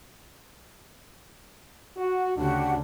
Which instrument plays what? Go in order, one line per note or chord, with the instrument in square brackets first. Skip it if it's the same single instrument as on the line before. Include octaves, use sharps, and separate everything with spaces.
[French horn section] F#4
[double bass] D2 C#3 [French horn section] D4 [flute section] F#4 G4 F#5